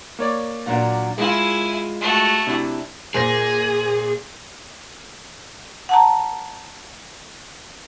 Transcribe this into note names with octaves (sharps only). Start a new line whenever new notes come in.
A#3 C#5 D5
A#2 F#3 D4
G#3 E4 F4 G#5
A3 F#4
C3 D4 E4
A#2 G#4 C5 A#6
F#5 A5 A#5